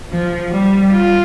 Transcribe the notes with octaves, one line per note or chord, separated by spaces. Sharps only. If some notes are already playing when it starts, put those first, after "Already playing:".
F3
G3
F4